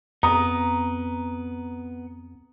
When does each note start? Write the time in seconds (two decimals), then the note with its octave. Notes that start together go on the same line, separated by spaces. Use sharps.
0.23 F2 B3 A#5 D#6